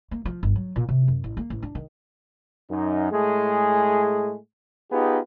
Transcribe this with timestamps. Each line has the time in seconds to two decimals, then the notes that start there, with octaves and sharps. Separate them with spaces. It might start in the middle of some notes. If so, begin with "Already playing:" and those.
0.11 A#3
0.25 F3
0.43 G1
0.56 F#3
0.76 A#2
0.89 C3
1.08 F#2
1.24 A1
1.37 A#3
1.50 A1
1.62 D4
1.75 D#3
2.70 F#2 D#4
3.12 A2 G#3 A3 G#4
4.92 B3 D#4 F4 G4 G#4 B4